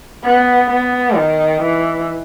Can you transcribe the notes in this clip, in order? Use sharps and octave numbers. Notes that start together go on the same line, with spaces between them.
B3
B3
D#3
E3